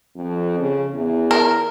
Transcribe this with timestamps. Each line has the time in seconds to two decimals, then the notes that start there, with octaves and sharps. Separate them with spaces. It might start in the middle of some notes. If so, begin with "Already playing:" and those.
0.16 F2
0.59 C#3
0.94 E2
1.31 A#4